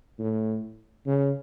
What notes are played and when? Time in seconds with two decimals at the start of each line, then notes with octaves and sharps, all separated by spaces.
0.19 A2
1.06 C#3